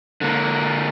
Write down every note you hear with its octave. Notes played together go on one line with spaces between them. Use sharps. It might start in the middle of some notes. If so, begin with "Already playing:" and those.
D3 A#3